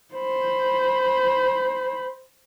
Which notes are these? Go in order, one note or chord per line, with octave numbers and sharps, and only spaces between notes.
C5 B5